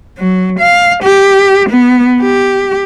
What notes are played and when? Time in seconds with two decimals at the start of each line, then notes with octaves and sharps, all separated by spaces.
0.19 F#3
0.59 F5
1.03 G4
1.69 B3
2.22 G4